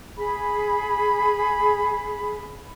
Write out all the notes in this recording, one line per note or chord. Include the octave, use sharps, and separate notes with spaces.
G#4 B5